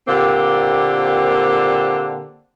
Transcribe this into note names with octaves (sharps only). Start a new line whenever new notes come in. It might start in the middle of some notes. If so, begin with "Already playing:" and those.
A#2 D3 A#3 C4 G4